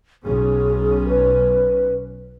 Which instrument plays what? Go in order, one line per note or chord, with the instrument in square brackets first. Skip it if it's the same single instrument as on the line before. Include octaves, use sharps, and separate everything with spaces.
[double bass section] B1 C#4 [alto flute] G#4
[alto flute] B4